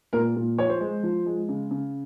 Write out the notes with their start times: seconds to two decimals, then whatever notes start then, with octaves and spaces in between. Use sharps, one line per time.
0.13 A#2 A#4
0.36 A#2
0.58 F3 C#5
0.69 C5
0.80 G#3
1.03 F3
1.26 G#3
1.49 C#3
1.71 C#3